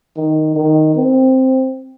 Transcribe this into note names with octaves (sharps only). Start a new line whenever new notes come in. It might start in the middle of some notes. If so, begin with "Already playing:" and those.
D#3
D#3
C4